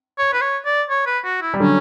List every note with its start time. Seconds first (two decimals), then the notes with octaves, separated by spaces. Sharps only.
0.18 C#5
0.33 B4
0.41 C#5
0.66 D5
0.90 C#5
1.06 B4
1.25 F#4
1.42 E4
1.54 G3
1.60 D3 F#3 C#4